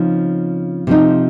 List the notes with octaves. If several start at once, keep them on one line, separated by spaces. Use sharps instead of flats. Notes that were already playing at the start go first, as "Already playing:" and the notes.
Already playing: C#3 F3 C4 D#4
C3 F3 C4 D#4